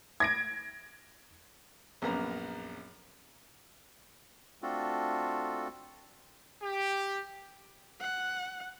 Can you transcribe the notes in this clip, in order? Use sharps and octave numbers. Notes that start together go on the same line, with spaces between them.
G#6 A#6 D7
A#1 F#2 A#3 B3 A#5
A3 C4 D4 F4 F#4 A4
G4
F#5